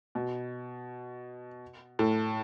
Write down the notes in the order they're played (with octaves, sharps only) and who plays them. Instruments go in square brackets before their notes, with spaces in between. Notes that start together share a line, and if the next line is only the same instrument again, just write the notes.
[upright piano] B2
A2